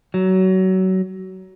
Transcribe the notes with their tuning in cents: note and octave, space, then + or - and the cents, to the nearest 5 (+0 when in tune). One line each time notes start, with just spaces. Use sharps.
F#3 +25